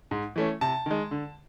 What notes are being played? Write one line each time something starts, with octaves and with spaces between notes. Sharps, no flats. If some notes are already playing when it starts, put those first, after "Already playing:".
G#2
E3 A3 C#4
C3 A5
D#3 G#3
D3